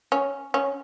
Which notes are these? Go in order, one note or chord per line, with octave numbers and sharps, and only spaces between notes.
C#4
C#4